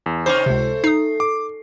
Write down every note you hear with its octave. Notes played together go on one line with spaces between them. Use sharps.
E2
C3 C#4 D#4 C5 C#6 D6
C#2 C3 A3
D#4 D#6 C7
D6